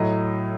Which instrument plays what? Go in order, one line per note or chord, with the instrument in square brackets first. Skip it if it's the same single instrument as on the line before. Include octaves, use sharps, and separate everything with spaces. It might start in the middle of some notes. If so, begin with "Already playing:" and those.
Already playing: [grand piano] A2 F#3 D#5